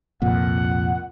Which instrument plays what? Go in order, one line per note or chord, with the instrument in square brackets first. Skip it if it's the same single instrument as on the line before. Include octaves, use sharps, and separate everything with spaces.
[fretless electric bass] C2 F2 A#2 [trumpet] F#5